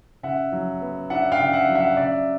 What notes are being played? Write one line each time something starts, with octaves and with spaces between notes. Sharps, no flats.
C#3 E5 F#5
F#3
B3
D4 E5 F#5
F5 G5
C#3
E5 F#5
F#3
E5 F#5
C#3 D5 E5